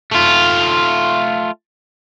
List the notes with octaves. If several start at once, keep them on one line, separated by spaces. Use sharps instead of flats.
A3 F4